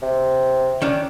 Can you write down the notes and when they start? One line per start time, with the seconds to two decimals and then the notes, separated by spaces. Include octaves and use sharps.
0.03 C3
0.82 D#3 C#4 D4